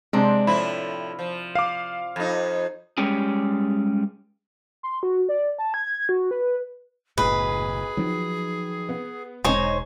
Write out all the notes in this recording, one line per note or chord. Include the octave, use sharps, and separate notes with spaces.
C3 G#3 C4 D4
A2 F3 E4 B5
F3
F5 D6
F2 D#4
G3 G#3 C#4 G4 G#4
C6
F#4
D5
A5
G#6
F#4
B4
F#1 B1 A2 G#4 B4
D#3 F3 F#3
B3
E1 G#2 D#4 C5 C#5 D#5 G#5